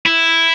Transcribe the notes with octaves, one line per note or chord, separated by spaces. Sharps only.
E4